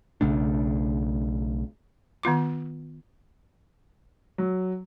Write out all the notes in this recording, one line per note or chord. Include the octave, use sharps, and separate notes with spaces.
B1 C#3 A3 D4
D#3 B3 F4 D6
F#3